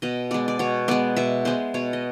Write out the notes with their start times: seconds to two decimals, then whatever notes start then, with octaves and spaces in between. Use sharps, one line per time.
0.02 B2 D#5
0.31 G#3 B3 D5
0.48 D5
0.59 B2 C#5
0.88 G#3 B3 D5
1.16 B2 E5
1.45 G#3 B3 C5
1.74 B2 C#5
1.93 D#5